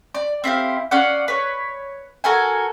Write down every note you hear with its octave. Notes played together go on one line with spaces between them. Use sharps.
D5
C4 E4 G4 F5
C#4 D5 F5 F#5
B4 C#5
F#4 A4 A#4 G#5